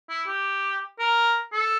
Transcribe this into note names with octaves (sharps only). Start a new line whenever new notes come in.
E4
G4
A#4
A4